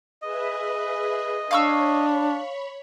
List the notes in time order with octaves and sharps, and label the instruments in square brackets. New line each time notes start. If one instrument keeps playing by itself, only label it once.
[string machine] G#4 B4 E5 [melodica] D#5
[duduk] D4 [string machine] C#5 B5 [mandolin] F5 C#6 E6